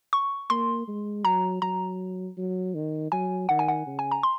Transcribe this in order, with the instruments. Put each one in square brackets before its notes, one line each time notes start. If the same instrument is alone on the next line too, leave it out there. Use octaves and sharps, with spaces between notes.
[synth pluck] C#6
[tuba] A#3 [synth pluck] C6
[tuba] G#3
[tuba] F#3 [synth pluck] A#5
[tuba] F#3 [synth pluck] A#5
[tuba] F#3
D#3
[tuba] F#3 [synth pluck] G#5
[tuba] D#3 [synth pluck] F#5
[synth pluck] G#5
F#5
[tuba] C#3
[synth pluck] G#5
A#5
C6